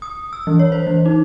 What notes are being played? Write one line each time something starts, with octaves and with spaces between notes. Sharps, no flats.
D#6
E6
E3
C#5
C5
E3
D#4